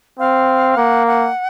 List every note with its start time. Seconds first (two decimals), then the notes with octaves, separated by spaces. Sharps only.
0.19 C4 F5
0.77 A#3 F#5
1.07 F#5